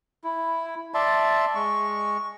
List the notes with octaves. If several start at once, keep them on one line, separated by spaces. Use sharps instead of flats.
E4
D5 E5 A5 C6
G#3 C#6